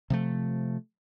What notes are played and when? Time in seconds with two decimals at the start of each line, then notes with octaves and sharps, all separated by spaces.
0.10 C3 F3 A3